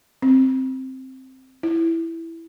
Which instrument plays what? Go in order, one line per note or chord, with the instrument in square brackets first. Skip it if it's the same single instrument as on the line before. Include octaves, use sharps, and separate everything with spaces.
[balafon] C4
E4